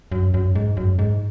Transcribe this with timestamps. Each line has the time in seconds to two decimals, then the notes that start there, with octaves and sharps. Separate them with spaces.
0.12 F#2
0.34 F#2
0.55 G#2
0.77 F#2
0.99 G#2